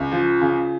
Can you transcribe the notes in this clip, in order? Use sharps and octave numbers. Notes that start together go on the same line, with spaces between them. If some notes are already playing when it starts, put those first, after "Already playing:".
Already playing: C#2
F3
C#3